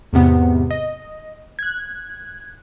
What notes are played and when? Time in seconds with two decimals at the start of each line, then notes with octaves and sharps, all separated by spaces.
0.13 E2 G#2 C3 B3
0.70 D#5
1.59 F#6 G#6